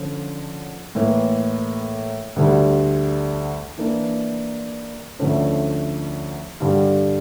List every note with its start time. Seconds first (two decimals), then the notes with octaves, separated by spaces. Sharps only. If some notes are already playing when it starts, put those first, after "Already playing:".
Already playing: D3 F3 C#4 F4
0.95 A2 E3 A#3
2.36 D2 D3 G3
3.78 E3 A#3 D4
5.19 D2 D3 F3 A3 C#4
6.60 G2 D3 G3